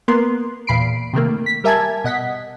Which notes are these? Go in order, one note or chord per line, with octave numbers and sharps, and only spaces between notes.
A#3 B3 A#4 C6
E2 A#2 B5 C7 D7
C3 D#3 A3 A#3
B6
G3 A#4 E5 G#5 A5 G#6
B2 D#5 F#5 B6